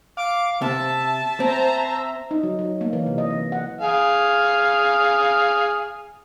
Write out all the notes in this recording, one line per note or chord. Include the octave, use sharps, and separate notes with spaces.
F5 D6
C3 E5 A5
C4 C5 A#5
D#4
F#3
F#3
A#3
E3
C3
D#5
E3
F#5
G#4 F5